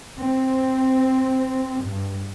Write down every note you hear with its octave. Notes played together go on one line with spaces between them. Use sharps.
C4
G2